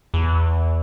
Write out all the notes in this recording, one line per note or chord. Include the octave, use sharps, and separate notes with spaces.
E2